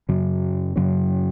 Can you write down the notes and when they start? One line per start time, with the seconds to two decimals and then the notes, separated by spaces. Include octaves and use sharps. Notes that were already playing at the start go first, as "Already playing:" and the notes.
0.09 F#2 C#3 F#3 C#4
0.76 F#2 C#3 F#3 C#4